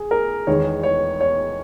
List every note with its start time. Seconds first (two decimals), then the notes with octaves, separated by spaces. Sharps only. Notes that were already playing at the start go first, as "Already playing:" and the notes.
Already playing: G#4
0.11 A#4
0.47 E2 D#3 G#3 B3 C#5
0.83 C#5
1.21 C#5